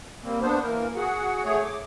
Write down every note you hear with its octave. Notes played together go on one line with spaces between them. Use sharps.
G3 A#3 C4
B3 D4 C5
E3 A#3 A#4
F#4 G#4 F#5
A3 G#4 C#5
D6